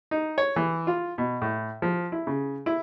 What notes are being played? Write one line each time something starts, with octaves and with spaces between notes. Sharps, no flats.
D#4
C#5
E3
F4
B2
A2
F3
E4
C#3
E4